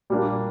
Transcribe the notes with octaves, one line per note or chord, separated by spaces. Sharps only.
A#2 G3 A#3 D4